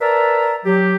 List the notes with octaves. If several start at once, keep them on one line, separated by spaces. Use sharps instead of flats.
A#4 B4 D5 E5 A5 A#5
F#3 G4